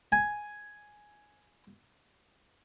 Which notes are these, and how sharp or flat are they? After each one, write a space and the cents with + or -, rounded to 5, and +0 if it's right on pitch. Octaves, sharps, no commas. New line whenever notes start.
G#5 +5